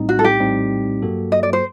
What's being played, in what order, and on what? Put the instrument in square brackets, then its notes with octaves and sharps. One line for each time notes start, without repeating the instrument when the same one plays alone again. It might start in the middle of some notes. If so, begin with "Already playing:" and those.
Already playing: [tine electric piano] A#1 A2 G3 C4 D#4
[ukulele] F#4
A4
G4
[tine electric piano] A#1 A2 G3 C4 D#4
G2 F#3 A#3 F#4 A4
[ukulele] D#5
D5
C5